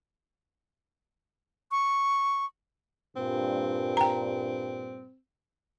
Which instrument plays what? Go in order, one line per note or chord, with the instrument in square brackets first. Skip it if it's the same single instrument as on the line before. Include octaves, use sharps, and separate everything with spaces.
[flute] C#6
[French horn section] G2 A#2 [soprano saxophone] C4
[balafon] G5 A#5